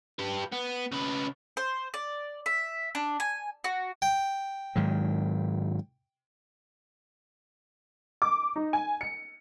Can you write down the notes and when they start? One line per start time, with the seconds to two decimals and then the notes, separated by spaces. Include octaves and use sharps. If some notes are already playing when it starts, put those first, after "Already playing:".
0.19 G4 B4
0.53 B3
0.92 C#3 B4
1.57 C5
1.94 D5
2.46 E5
2.95 D4
3.20 G#5
3.64 F#4
4.02 G5
4.76 G#2 D#3 F#3
8.22 D6
8.56 D#4
8.73 G#5
9.01 C#7